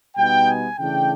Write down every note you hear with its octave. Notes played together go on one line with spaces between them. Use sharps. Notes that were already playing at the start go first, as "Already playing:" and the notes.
B2 G3 B3 D#4 G5
G#5
C#3 E3 A3 D4 G5